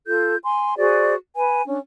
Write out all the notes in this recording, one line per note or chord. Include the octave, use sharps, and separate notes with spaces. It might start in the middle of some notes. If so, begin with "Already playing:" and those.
F4 A4 G6
G#5 C6
F#4 G#4 C5 D5
B4 G#5
C#4 D4